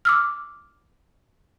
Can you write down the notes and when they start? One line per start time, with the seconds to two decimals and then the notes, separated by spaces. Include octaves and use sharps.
0.05 D6 E6 F6